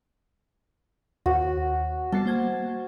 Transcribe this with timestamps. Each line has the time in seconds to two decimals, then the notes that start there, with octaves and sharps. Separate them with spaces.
1.26 D#2 F#4
2.12 G3 B3 A5 C7
2.26 A#3 C5 G#6